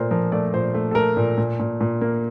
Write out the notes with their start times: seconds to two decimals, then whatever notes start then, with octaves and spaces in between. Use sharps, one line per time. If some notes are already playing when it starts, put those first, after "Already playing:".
Already playing: A#2 A3 A#4 C5
0.11 F3 A#4
0.32 A3 D5
0.54 A#2 C5
0.74 A3
0.91 A4
0.95 A3 A#4
1.17 A#2
1.38 A#2
1.60 A#2
1.81 A#2
2.01 A#3